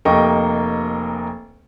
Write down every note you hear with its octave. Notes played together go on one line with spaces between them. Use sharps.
F1 A#3 D#5 G5 C#6